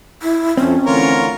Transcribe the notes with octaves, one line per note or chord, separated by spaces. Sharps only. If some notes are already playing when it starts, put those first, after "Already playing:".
E4
F2 F3 C4 C#4
D3 E3 A3 F4 A#4 C#5